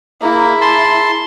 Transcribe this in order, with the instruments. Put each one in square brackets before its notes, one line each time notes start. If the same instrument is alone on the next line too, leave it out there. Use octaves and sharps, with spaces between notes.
[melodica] A#3 [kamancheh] E4 [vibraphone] G#4 A#5 D6
[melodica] A5 C6